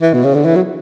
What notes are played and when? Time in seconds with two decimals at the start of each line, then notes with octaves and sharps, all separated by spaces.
0.02 E3
0.14 B2
0.24 C#3
0.35 D3
0.45 E3
0.55 F#3